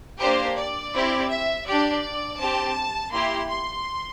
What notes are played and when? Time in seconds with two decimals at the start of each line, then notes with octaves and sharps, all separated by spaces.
0.21 A#3 D4 G4 C5
0.58 D5
0.93 C4 E4 G4
1.31 E5
1.66 D4 G4 D5
2.39 C4 G4 A5
3.12 A#3 E4 G4 C6
3.49 C6